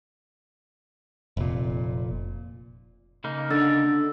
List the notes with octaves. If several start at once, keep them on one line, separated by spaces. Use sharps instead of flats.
F1 A#2
C#3 A#3 D#4
D3 E6 A6